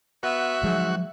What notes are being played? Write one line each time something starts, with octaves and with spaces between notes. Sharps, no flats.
B3 F#4 E5
G#2 F3 F#3 G#3